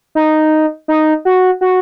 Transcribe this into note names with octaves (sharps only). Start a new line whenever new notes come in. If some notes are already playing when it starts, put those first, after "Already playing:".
D#4
D#4
F#4
F#4